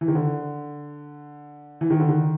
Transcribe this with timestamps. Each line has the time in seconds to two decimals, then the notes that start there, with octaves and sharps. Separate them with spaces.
0.01 E3
0.08 D#3
0.15 D3
1.81 E3
1.90 D#3
2.00 D3
2.09 D#3